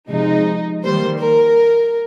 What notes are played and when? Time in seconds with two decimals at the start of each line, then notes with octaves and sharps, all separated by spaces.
0.09 C3 F3 G#3 D#4
0.84 D#3 G3 A#3 C5
1.21 A#4